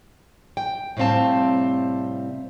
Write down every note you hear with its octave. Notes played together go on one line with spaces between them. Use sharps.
G5
A2 C3 G3 C4 F5 A5